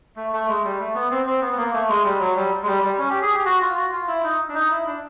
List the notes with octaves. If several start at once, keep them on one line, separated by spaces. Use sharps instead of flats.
A3
A3
G#3
G3
A3
B3
C4
C4
B3
B3
A#3
A3
G#3
G3
F#3
G3
G#3
G3
G3
C#4
G4
G#4
G4
F#4
F4
F#4
F4
E4
D#4
D4
D#4
E4
D4